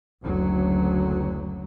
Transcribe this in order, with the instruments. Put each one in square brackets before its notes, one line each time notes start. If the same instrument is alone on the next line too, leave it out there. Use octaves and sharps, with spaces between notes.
[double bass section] F#1 D2 F#3